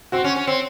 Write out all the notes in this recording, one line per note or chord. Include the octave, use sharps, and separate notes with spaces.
C4 F#4
C#4
C#4
C4